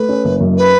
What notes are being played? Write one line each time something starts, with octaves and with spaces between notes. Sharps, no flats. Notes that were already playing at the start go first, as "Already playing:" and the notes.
Already playing: A3 B4
C#4
F#1
F#2
B4